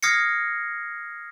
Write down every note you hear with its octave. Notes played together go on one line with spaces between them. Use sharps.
D#6 F6 G#6 A#6 C7 C#7